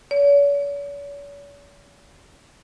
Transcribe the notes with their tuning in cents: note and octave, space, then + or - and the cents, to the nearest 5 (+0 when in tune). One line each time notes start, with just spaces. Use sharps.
C#5 +45